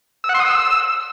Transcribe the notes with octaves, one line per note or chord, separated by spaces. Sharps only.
E6
F#5
C6
D#6
E6